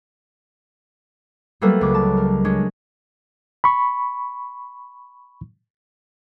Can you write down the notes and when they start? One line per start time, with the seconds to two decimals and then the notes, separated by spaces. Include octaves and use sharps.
1.61 F#3 G3 A3 A#3 A4 B4
1.81 C#2 D6
1.94 A5
2.17 A#4
2.45 G#3 C#4 D4
3.64 B5 C#6